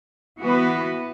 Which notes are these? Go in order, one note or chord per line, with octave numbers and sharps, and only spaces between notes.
E3 B3 F#4 B4